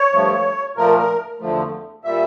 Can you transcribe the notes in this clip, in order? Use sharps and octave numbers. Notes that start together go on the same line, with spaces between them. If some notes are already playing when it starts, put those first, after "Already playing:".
Already playing: C#5
G2 F3 A3
A#2 F3 A3 A#4
A#4
E2 D3 F3 A3
A#2 G3 E5